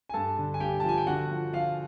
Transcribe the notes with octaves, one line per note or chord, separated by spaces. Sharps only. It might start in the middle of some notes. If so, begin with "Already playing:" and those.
G#5
G2 A4 A5
D3
G#5
G2 G4 G5
F3 A5
G#5
G5
D3 F#4 F#5
F3
F3 F4 F5